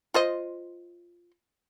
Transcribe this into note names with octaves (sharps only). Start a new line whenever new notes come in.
F4 C5 D#5